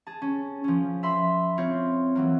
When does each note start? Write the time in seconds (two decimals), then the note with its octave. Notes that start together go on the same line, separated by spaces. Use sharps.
0.07 G#4 A5
0.22 C#4
0.64 F3 C#4
1.03 E5 B5 C6
1.58 C4 F4 C#5
2.15 E3 F#3 A#3